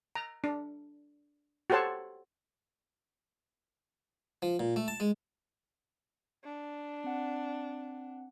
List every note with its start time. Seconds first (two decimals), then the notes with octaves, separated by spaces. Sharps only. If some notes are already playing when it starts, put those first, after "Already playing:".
0.15 A#5
0.44 D4
1.70 F#4 G4 A4 C5 C#5 A5
4.42 F3
4.59 A#2
4.76 A3
4.88 A5
5.00 G#3
6.44 D4
7.04 C4 F#5